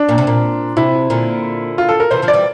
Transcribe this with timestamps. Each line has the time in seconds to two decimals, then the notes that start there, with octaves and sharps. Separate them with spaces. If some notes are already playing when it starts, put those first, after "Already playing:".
Already playing: D4
0.09 A#2
0.18 C3
0.27 A#2
0.77 C3 E4
1.10 A#2 D3
1.78 F4
1.89 A4
2.00 A#4
2.11 C3 E3 C5
2.22 D3 F3
2.28 D5
2.33 E3 G3